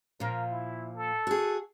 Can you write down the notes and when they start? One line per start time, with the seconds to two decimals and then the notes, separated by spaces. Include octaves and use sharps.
0.20 A#2 F3 A#4
0.51 E4
0.95 A4
1.27 F#4 G#4